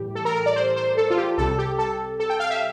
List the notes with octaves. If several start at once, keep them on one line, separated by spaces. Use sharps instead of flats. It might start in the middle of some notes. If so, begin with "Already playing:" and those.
Already playing: A2 E3 G3 G4
A4
A#4
A#4
D5
C5
C5
A4
F4
G4
C2 C3 G3 A4
G4
A4
A4
G5
F5
E5